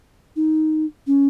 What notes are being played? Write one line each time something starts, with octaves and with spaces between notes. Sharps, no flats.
D#4
C#4